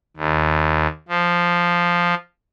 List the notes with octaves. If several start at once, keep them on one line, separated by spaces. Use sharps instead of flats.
D#2
F3